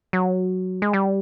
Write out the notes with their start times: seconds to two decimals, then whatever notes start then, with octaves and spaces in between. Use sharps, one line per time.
0.13 F#3
0.82 G#3
0.93 G3